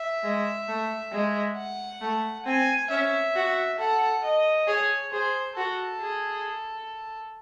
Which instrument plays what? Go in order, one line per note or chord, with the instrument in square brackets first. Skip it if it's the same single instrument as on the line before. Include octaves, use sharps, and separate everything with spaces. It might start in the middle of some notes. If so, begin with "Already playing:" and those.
Already playing: [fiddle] E5
[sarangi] G#3
A3
G#3
[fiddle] F#5
[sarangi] A3
[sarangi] C4 [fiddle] G#5
[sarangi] C#4 [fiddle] E5
[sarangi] F#4
[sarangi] A4 [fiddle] F#5
[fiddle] D#5
[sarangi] G#4 [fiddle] C#5
[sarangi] G#4 [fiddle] C5
[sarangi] F#4 [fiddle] A4
[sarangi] G#4